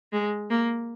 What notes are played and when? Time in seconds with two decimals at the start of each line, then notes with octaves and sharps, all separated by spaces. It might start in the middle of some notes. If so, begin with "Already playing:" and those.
0.13 G#3
0.50 A#3